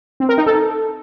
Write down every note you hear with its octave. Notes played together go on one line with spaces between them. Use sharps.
C4
A#4
D#4
A4